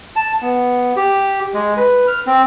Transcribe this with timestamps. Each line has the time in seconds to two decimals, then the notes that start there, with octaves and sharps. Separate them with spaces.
0.16 A5
0.42 B3
0.97 G4
1.54 G#3
1.77 B4
2.08 F6
2.27 C4